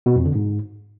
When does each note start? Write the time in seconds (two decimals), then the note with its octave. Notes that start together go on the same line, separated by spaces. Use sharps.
0.06 B2
0.16 F2
0.25 D3
0.35 G#2